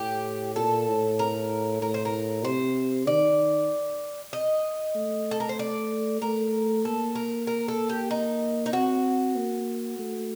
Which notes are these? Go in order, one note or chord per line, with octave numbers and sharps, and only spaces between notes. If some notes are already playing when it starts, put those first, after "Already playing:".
Already playing: A2 G4
A#2 A4
A2
A#4
A2 A#4
C5
A#4
C3 C5
D#3 D5
D#5
A3
A4
A#4
C5
D5
A3 A#4
A#3 A4
A#4
A#4
A4
G4
D#4
D#4
C4 F#4
A#3
A3